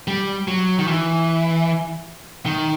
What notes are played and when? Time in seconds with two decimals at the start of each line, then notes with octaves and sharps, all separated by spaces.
0.08 G3
0.48 F#3
0.79 D#3
0.87 E3
2.46 D#3